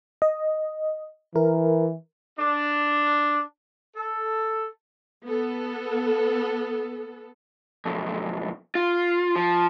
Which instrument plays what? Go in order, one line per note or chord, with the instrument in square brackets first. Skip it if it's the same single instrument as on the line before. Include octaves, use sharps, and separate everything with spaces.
[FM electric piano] D#5
[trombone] E3 [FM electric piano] A#4
[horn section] D4
A4
[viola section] B3 A4
[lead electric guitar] B1 F2
F4
F3